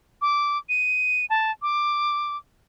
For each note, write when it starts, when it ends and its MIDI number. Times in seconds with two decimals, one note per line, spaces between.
0.22 0.58 86
0.69 1.25 99
1.30 1.51 81
1.62 2.37 86